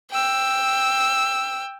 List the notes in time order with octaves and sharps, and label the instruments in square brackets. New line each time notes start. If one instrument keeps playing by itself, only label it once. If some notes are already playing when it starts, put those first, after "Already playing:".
[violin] G5 E6